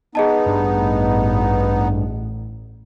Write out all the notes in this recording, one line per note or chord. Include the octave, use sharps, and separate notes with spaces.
B3 D#4 G#4 D#5 A5
A1 G2